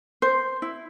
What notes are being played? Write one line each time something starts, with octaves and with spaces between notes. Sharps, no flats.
C5
E4